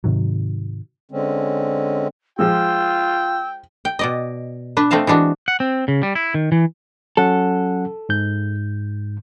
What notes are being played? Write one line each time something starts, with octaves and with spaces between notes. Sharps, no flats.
G#2 C3 D#3 F#3
D3 G#3 C4 C#4
F3 G#3 F4 G5 E6
G5
B2 D5 D#5
D4 B4
A3 C4 D#5 F5 A5
E3 G#3 D4 F#4
F#5
C4
C#3
G3
E4
D#3
E3
F#3 C#4 A4 F#5
G#2 G6